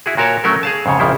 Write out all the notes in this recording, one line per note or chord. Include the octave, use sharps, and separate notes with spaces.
E4 F#4 G#4
A#2 F#4 A#4 C#5 A5
F#3 A3 C#4 F#4 A#4
G#4 F5 A5
F2 G#2 C#3 C#5
A#1 F2 C#3 F3 E4 C5